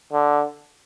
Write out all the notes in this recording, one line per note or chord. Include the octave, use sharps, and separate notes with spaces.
D3